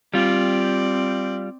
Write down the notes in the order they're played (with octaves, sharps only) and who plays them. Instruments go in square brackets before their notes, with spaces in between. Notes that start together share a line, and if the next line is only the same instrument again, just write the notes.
[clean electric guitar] G3 F4 [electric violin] C4 D5